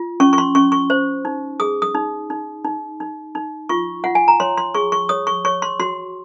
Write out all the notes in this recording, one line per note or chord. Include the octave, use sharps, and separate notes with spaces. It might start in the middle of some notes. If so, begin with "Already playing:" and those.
Already playing: F4
C#4 C#6
C#6
C6
C#4 C#6
C#6
C5
D#4
G#4 D#6
D#6
D#4
D#4
D#4
D#4
D#4
F4 C#6
F4 F#5
G#5
A#5
C#5 C6
C6
G#4 C#6
C#6
C#5 D#6
C#6
C#5 C#6
C6
F#4 C6